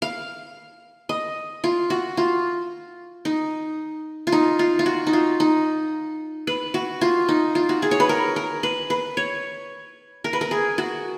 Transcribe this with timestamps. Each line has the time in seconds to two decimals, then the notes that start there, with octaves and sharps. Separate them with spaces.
0.02 F5
1.09 D#5
1.64 F4
1.90 F#4
2.17 F4
3.25 D#4
4.27 F4
4.32 D#4
4.59 F4
4.79 F4
4.86 F#4
5.07 D#4
5.13 F4
5.40 D#4
6.47 B4
6.74 F#4
7.01 F4
7.29 D#4
7.55 F4
7.69 F#4
7.82 G#4
7.91 C#5
8.00 B4
8.09 A#4
8.36 A#4
8.63 B4
8.90 B4
9.17 C#5
10.24 A#4
10.33 B4
10.41 A#4
10.51 G#4
10.78 F#4